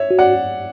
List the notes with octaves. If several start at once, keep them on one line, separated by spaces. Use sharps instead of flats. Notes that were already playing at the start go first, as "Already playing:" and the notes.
Already playing: C#5 E5
F#4
D5 F#5